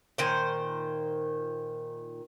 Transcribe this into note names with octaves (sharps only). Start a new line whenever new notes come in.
A#2 D#3 C5